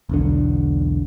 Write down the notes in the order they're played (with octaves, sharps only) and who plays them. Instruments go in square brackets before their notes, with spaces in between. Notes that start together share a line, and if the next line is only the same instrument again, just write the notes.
[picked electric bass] E1 B1 D3